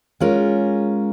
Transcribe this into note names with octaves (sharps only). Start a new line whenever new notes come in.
G#3 C#4 F4 A#4